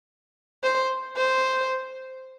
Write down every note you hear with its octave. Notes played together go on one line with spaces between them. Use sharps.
C5
C5